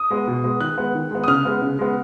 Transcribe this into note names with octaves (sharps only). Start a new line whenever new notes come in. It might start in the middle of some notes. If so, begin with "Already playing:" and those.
Already playing: D#6
G#3 B3
B2
G#3 B3
D#3 F#6
G#3 B3
D#3
G#3 B3
D#6
C#3 F6
G#3 B3
C#3
G#3 B3